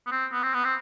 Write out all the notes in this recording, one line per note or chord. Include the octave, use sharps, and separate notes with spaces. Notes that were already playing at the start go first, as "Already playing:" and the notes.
B3
C4
B3
C4
B3
C4